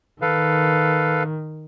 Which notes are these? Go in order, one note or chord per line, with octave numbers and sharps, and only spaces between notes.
D#3 A4 B4 F5